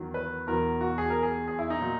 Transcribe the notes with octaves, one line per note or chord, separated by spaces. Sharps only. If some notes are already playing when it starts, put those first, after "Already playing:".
Already playing: E2 D#3 F#3
B4
E2 B2 F#3 A#4
F#4
G#4
A#4
G#4
G#4
E4
D#4
A#2 F#3